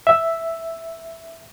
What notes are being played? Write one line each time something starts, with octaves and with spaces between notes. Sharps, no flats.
E5